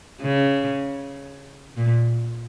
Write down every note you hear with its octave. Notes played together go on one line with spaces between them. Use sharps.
C#3
A#2